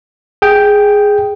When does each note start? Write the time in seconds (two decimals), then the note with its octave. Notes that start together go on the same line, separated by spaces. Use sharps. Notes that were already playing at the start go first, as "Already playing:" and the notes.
0.42 G#4 G5